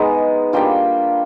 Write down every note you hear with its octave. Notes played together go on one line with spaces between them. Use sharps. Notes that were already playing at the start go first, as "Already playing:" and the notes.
Already playing: G#3 B3 D#4 G#5
G3 A#3 D4 F4 G5